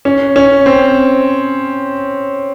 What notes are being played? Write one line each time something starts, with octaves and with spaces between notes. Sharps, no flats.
C#4
C#4
C4